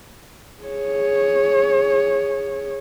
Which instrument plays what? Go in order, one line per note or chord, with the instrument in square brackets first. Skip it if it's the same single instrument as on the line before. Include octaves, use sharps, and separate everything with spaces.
[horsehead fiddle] G#4 C#5